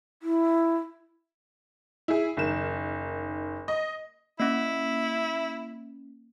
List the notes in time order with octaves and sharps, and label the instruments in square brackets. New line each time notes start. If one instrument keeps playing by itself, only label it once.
[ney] E4
[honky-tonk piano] E4 G#4
F#1 D#3 E7
D#5
[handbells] A#3 C#4 [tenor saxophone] E4